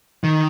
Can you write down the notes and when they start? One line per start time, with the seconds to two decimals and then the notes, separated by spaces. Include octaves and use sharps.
0.24 D#3